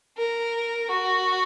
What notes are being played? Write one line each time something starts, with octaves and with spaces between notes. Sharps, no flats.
A#4
F#4